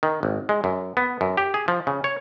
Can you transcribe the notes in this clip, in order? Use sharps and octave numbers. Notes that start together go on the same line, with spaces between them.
D#3
G#1
G#3
F#2
B3
F#2
G4
G#4
F3
C#3
C#5